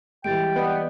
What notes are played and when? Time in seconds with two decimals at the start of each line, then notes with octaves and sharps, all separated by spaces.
0.24 E3 G3 G#3 G5 A6 D7
0.56 B3 D5 D#5